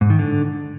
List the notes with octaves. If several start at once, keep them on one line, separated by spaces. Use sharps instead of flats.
G#2
D#3
D3